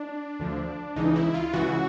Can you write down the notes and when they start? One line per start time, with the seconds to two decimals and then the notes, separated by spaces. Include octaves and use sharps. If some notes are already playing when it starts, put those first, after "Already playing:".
Already playing: D4
0.39 D2 D3 F3
0.96 C#2 C#3 E3 D#4
1.16 E4
1.34 F4
1.53 C#2 C#3 E3 F#4